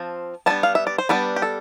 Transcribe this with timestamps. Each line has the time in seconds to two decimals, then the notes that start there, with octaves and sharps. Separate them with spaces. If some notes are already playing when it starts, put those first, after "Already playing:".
Already playing: F3 C4 A5
0.46 G3 B3 D4 A5
0.63 F5
0.75 E5
0.87 D5
0.98 C5
1.09 G3 B3 D4 B4
1.36 G4
1.42 A4